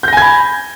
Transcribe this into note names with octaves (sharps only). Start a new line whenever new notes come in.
G#5 B5 G6 G#6 A#6